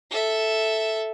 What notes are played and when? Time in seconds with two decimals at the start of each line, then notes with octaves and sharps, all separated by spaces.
0.11 A4 E5